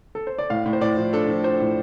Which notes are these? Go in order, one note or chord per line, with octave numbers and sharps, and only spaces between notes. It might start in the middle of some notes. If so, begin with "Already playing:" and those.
A4
C5
D5
A2 F5
A2
C5
A2 D5
F3
D4 A4
F3
D4 C5
A2